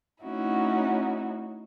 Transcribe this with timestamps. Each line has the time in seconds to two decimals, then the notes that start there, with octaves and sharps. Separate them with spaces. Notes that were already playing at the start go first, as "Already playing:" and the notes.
0.23 A3 C4 C#4 D#4 E4 F#4